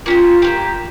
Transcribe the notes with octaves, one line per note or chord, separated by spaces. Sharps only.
A#3 C#4 F4 G4
A#3 C#4 G4